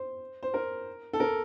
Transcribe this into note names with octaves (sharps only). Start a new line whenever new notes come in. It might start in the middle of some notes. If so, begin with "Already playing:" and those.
Already playing: C5
C5
A#4
A4
A#4